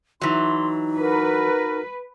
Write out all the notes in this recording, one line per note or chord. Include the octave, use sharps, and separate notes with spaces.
E3 F#3 D#4 C6
F#4 A#4 B4